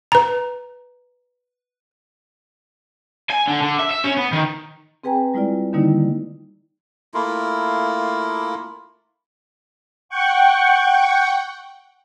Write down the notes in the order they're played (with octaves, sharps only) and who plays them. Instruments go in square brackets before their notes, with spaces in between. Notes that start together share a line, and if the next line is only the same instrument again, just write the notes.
[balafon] B4 A#5
[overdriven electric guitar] G#5
D3
D3
E5
E5
C#4
B3
D#3
[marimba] C4 G#4 B4 G5 G#5 A#5
G3 G#3 E4 F4 D5
D3 D#3 G3 A#3 D#4 E4
[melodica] A3 A#3 E4 F4
[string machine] F#5 G5 C#6